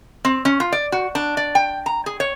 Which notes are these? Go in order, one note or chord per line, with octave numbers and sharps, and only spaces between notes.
C4
C#4
F4
D5
F#4
D4
D5
G5
A#5
G#4
C#5